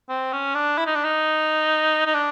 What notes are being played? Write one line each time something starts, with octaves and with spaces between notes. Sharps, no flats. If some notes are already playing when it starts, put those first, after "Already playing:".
C4
C#4
D4
E4
D#4
D4
D#4
D#4
D4